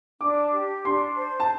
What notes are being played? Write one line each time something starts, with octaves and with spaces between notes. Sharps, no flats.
D4 D6
G4
D4 C6
C5
A5